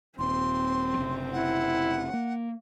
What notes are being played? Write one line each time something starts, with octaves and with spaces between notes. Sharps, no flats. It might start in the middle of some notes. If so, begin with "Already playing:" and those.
D#1 C4 C6
F#1 C3
E4 F#5
A#3